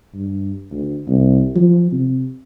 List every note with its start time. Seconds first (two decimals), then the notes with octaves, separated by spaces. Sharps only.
0.14 G2
0.72 D2
1.08 C2
1.56 F3
1.92 C3